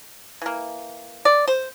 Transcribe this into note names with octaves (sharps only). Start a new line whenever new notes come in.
E3 A#3
D5
C5